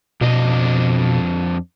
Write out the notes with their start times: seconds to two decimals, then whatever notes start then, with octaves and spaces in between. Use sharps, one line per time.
0.21 F2 B2 D4 D#5